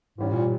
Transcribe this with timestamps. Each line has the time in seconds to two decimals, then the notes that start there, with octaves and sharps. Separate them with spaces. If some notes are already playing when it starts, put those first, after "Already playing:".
0.18 G#2 E3 G3 C#4
0.32 A#2